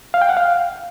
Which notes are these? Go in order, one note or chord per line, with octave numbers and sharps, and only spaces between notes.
F5
G5
F#5
F5